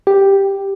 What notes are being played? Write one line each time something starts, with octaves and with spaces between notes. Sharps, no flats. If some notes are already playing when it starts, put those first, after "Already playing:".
G4